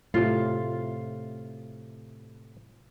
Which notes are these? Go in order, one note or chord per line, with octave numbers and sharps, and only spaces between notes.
A2 C3 F4